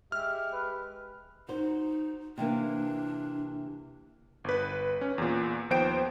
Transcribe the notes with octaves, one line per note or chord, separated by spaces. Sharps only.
G#3 G4 E5 F6
B4
D#4 F#4 C5
C3 E3 A#3 D4
G1 B4
C#4
E2 A#2
D#2 F3 B3 C5 G5 D7